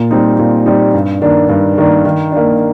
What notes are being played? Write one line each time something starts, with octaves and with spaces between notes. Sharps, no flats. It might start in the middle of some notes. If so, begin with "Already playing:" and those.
Already playing: A#2
G3 C4 D#4
A#2
G3 C4 D#4
G2
D#3 A#3 D4
G2
D#3 A#3 D4
D#3
A#3 D4